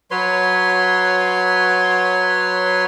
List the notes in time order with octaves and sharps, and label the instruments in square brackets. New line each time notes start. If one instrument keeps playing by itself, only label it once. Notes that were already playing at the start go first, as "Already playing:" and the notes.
[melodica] F#3 B4 C#5 C6